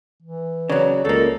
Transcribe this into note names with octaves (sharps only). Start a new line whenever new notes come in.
E3
C#3 F#3 C#5 D5
C#2 C#3 A#3 A4